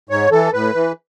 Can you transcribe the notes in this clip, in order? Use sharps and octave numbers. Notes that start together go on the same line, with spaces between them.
G#2 C#5
E3 A4
A2 B4
E3